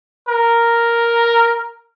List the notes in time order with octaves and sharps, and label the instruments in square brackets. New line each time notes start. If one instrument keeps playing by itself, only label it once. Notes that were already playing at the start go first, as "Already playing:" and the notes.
[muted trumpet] A#4